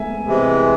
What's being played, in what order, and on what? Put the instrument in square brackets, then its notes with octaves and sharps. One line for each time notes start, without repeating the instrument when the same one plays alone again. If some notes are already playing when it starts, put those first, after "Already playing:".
Already playing: [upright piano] E5 G#5
[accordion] C3 E3 G#3